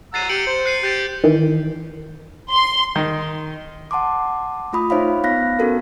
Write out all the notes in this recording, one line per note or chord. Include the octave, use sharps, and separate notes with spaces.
F#5 A#5 E6 A6 C7 D#7
G4 C#7 D7 F#7
C5
F#6 C7 D#7
G4 G6 A6 D7
D#3 E3
C6
D#3
F#5 A5 C6 D6
A3 F4 B5 D#6
D#4 C5 C#5 E5 F5 B5
B3 F5 F#6 A#6 B6
B3 C#4 F#4 A4 A#4